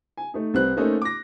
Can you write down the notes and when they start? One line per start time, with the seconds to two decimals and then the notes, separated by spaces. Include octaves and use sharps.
0.17 G#5
0.34 A3 D#4
0.54 C2 C4 B4 F#6
0.77 A3 A#3 C#4 D#4 A4 C5
1.02 D6 A#6